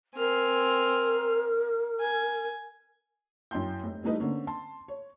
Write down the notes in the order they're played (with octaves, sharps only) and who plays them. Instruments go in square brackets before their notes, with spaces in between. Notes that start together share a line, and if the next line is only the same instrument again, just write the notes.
[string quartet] C4 G#5 F6 [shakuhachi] A#4
[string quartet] G#5
[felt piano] F#2 E4 G5 C6 G6
F1
E3 G3 A3 D#4 B4 D#5
D3 A#3 C4 C#4
A5 C6
C#5